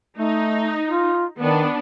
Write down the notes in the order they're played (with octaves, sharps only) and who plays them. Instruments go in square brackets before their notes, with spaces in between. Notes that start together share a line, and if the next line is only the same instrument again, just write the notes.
[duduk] A3 [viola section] D#4
[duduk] F4
[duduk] D#3 [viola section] B3 D4